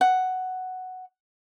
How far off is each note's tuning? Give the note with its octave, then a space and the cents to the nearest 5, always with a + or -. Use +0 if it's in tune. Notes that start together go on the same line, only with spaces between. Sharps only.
F#5 +5